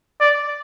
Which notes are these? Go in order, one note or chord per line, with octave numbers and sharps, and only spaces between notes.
D5